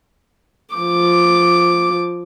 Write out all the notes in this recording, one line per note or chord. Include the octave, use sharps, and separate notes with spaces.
F3 D6